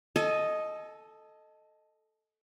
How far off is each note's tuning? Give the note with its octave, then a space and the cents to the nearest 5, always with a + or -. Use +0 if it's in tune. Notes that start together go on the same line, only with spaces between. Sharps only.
A4 +0 D#5 +0 G#5 +40